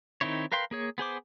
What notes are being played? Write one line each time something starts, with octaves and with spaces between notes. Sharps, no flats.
D#3 C4 D#4 E4 C#5
A#4 B4 F5 G5 C6
A#3 G#4 C#5
B3 G#4 C5 D6